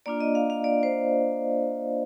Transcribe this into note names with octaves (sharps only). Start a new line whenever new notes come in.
A#3 D4 F4 D5
D#5
F5
F5
D5
C5